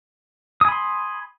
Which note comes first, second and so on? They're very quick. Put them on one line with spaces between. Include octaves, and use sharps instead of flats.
D#6 G#5 B5 C6